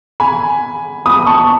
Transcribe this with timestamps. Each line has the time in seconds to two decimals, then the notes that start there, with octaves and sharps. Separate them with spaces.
0.20 G#5 B5
1.06 B5 D#6
1.26 A5 C#6